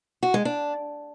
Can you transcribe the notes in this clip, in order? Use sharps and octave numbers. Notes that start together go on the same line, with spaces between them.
F#4
G#3
D4